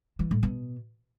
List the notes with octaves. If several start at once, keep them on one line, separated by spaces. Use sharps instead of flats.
E3
A2
B2